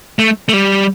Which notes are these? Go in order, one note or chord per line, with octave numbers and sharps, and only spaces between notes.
A3
A3
G3